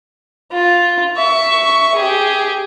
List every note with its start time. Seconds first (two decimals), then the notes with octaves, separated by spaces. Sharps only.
0.52 F4
1.16 E5 C#6
1.94 G4 G#4